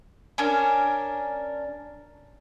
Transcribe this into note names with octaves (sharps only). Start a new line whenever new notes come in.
C#4 D4 A#4